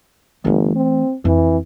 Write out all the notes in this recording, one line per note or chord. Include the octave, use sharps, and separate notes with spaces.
G1 E3 A3
C4
F2 E3